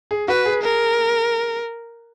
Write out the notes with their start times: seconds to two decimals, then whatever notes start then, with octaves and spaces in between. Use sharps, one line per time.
0.11 G#4
0.28 F#4 B4
0.46 G#4
0.63 A#4